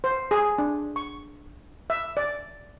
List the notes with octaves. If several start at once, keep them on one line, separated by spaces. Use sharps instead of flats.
C5
G#4
D4
C#6
E5
D5